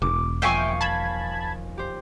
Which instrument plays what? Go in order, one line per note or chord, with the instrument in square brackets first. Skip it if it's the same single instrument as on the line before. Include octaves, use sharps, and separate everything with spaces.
[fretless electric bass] E1 [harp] D6
[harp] D#2 F3 F4 [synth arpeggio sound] E5 G5 [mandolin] F5 G#5 C#6
[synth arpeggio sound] A5 B5 G#6
[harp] G4 C5